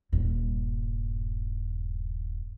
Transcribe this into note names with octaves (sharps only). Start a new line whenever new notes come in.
D#1 G2